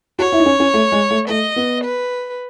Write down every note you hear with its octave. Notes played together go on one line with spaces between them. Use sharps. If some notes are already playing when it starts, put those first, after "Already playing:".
F#4 C#5
E4
D#4
C#4
C#4
A3
G#3
A3
A3 D#5
B3
B4